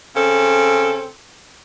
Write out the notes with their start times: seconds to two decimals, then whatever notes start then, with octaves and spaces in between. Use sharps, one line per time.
0.16 C#3 C4 A4